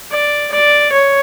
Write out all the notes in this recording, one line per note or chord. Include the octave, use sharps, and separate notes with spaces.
D5
D5
C#5